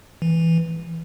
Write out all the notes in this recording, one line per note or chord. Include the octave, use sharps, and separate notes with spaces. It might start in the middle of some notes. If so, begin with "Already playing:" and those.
E3